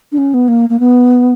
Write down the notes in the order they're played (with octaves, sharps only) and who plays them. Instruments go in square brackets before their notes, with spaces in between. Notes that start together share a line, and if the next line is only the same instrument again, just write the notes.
[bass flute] D4
C#4
B3
A#3
A#3
B3